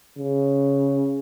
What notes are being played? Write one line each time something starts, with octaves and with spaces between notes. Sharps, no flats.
C#3